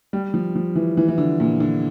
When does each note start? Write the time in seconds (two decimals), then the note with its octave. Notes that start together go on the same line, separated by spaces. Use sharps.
0.13 G3
0.34 F3
0.56 F3
0.75 E3
0.97 E3
1.08 E3
1.18 D3
1.40 A#2
1.60 D3